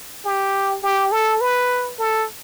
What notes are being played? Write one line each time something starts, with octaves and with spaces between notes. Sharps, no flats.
G4
G4
A4
B4
A4